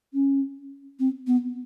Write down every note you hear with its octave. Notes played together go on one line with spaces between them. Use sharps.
C#4
C4
B3